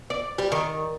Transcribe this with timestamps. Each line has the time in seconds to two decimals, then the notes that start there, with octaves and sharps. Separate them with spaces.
0.10 D5
0.38 G3
0.52 D#3